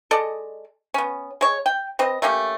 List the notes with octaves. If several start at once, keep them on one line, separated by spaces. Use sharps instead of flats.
G#3 A4 D5 D#5
B3 C#4
G#3 C#5
G5
C4 B4 D#5
A3 A#3 C#4 G4